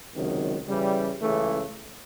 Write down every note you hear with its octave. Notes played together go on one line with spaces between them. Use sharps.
C#2 C3 D#3 F#3
C#3 E3 G3
C#2 C#3 E3 A3